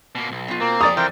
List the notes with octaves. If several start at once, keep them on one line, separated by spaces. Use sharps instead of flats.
B2 A#3
B1
B2 F4
A#3 C4
F2 D5 G#5 A#5 D#6 A6
E3 A#4 C5 G5